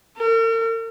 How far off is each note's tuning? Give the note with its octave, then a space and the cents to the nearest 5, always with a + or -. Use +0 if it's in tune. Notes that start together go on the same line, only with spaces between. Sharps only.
A#4 -45